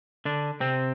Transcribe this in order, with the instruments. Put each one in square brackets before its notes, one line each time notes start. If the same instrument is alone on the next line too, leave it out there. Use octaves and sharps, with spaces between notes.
[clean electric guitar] D3 D4
C3 C4